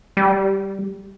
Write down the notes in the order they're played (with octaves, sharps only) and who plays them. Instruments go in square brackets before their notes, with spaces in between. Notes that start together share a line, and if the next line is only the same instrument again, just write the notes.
[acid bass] G3